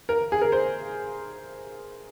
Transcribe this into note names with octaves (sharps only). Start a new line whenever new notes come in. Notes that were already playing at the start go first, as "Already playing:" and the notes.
A#4
G#4
A#4
C5